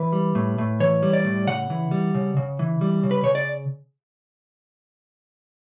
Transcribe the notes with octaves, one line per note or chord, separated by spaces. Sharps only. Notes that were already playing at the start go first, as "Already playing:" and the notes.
Already playing: E3 B4
G3
A2
A2
E3 C#5
G3
D5
A2
C#3 F#5
E3
G3
C#3
C#3
E3
G3
C#3
B4
C#3 C#5
D5